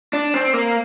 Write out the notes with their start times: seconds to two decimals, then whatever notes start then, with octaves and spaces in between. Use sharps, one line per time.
0.13 D4
0.34 C4
0.53 A#3